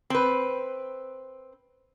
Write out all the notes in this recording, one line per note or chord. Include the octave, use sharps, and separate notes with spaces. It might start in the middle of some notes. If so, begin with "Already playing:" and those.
C4 B4